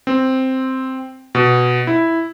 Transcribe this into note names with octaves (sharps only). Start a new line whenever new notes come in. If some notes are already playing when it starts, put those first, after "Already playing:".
C4
B2
E4